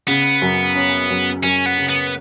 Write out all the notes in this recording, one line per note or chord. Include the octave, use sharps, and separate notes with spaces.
C#3 B3
F#2
C#4
F#2
F#2 C#4
B3
C#3
B3